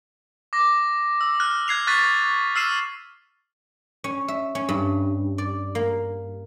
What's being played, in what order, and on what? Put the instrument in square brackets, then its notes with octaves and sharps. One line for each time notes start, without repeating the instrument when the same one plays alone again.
[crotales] D6 A#6
E6
F6 F#6
F#6 G#6 C7 F7
C#6 F#6 A6 B6 D#7
E6 F6 C7 D#7 E7
[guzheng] C#4
E5
C#4
G2
D5
A#3